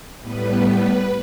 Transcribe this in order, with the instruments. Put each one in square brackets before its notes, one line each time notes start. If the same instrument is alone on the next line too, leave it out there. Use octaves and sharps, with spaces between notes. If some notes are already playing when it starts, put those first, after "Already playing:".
[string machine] A2 G3 B3 B4
B4